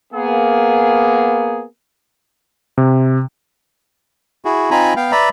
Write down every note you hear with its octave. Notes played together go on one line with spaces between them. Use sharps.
A#3 B3 G#4
C3
E4 F#4 G#4
C4 D#4 F4 G#5 A#5 B5
B3 F5 G5
B4 D5 E5 A#5 B5